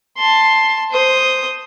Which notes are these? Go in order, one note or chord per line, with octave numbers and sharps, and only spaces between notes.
A5 C6
C5 D#6